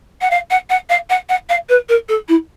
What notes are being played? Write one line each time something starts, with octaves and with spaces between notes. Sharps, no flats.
F#5
F5
F#5
F#5
F5
F#5
F#5
F5
B4
A#4
A4
E4